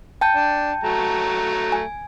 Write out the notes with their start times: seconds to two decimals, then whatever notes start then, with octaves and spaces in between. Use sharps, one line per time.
0.21 G5 A5 G6
0.36 D4 D5
0.84 F#3 A3 A#5
1.72 G#5